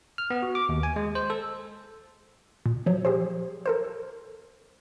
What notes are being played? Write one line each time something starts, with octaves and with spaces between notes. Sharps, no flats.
F6
B3
F#4
D6
D#2
G#5
G#3
C5
A4
A#2
F3 F#3
G4 G#4 C5
A4 A#4 C5